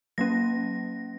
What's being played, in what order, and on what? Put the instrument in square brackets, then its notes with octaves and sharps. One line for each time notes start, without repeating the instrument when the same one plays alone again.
[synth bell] F#3 A#3 C#4 A#6